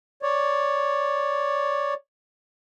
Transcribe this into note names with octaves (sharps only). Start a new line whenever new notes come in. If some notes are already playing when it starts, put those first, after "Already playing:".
C#5 D5